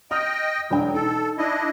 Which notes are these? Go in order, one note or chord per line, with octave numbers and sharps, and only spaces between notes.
D#5 G5 D#6 F6
E1 F#3 D4 G5
D#4 A4
D4 E4 D#5